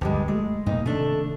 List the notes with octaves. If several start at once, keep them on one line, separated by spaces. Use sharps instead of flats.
D2 G2 G3 G#3
G#3 A3
G2 B2 A#3 D#4
C3 D#3 A3 D4